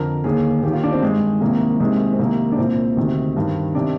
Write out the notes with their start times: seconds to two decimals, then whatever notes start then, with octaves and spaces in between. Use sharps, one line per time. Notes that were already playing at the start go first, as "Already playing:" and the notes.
Already playing: F2 D3 A#4
0.24 D#2 D3 G#4
0.63 D#2 D#3 G4
0.73 F4
0.84 D4
0.93 C4
1.02 G2 D#3 G#3
1.41 C2 C3 D#3 A#3
1.80 C2 C3 D#3 G#3
2.13 C4
2.19 C2 C3 D#3 A#3
2.52 D4
2.57 C2 A#2 C4
2.97 D2 C3 D#3
3.36 G2 D#3
3.75 C3 D#3 D4